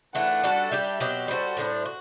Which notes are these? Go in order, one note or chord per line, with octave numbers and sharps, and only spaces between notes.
E3 A3 D4 F#5
G3 D4 F#4 A4
G3 D4 G4 E5
B2 F#3 C4 G4
G3 D4 F#4 A4 C5
A2 G3 D4
F#4